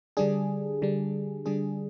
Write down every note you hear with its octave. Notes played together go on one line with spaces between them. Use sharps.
D3 G3 D4 G#4
D3 G3 D4
D3 G3 D4 G#4